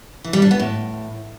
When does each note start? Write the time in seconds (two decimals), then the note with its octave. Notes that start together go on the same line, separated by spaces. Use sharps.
0.24 E3
0.33 G3
0.42 D4
0.51 B3
0.60 A2